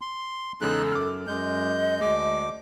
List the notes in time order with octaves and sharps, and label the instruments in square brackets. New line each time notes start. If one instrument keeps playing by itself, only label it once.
[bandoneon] C6
[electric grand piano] E2 C#3 G#3 [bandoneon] D#4 F#6 [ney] A4
[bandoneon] F#2 [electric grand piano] D6 F6
[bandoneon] F#2 G#3 G6 [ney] D#5
[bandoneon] D2 D6 [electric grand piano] G#3